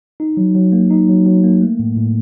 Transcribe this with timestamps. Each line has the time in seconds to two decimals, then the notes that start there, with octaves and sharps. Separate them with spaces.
0.20 D#4
0.37 F#3
0.55 F#3
0.72 A#3
0.91 D#4
1.09 F#3
1.26 F#3
1.44 A#3
1.62 A3
1.79 A2
1.96 A2